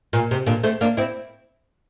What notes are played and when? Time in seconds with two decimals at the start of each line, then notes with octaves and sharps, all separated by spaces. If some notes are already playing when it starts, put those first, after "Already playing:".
0.13 A#2
0.31 C3
0.46 A#2 D3
0.64 A3 C4
0.81 A#3 D4
0.97 C4 E4